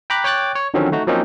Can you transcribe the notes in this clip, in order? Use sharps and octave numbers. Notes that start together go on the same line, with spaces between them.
G5 A#5 B5 D6 F#6
C#5 G5 D6 F#6 A6
C#5
D3 D#3 F3 F#3 C4 C#4
A3 D#4 F#4
F3 F#3 A#3 C4 C#4 D#4